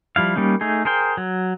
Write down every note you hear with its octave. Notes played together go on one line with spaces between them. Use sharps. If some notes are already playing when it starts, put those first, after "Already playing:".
F3 G3 E4 F5
G3 A#3 C#4 D#4
A3 D#4 G#4
G#4 A#4 C5 G5
F#3